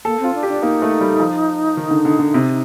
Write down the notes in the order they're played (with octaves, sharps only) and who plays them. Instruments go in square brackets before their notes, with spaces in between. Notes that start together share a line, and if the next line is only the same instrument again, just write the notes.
[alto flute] A#3 [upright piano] A4
[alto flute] C4 [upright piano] F4
[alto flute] D4
[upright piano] G4
[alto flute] D4
[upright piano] A#3 [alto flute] D#4
[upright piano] A3
G3
F3
D#3
D3
D3
D3
C3